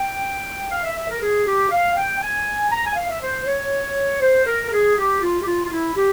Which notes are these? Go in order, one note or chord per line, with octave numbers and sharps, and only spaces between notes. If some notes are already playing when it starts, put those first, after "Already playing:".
Already playing: G5
F5
E5
E5
A#4
G#4
G4
F5
G5
G#5
A#5
G#5
F5
E5
C5
C#5
C5
A#4
A#4
G#4
G4
F4
G4
F4
F4
E4
G4